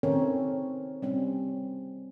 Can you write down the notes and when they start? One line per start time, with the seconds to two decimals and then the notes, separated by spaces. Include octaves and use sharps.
0.03 D#3 C4 C#4 A4 A#4 C#5
1.02 G3 C4 C#4